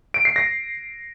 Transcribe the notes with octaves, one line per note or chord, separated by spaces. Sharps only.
D7
C7
A#6